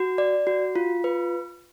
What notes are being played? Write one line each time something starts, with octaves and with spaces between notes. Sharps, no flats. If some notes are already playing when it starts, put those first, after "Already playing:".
Already playing: F#4
D5
F#4
F4
B4